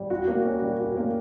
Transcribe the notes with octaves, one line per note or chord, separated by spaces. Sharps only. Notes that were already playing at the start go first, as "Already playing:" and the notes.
Already playing: G3
F#4
A#3
C#4
G3
F#4
A#3